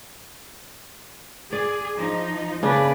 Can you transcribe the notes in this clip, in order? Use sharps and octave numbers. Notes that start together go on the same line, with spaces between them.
G#4 D5
F3 D#4
C#3 A#3 D4 B4 D5